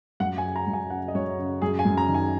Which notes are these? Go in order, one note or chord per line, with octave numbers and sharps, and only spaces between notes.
F#2 F#5
G#5
C#3
A#5
F#2
G#5
C#3 F#5
D#5
F#2 C#5
C#3
F#2 G#4
G#5
F#2
A#5
D#3
G#5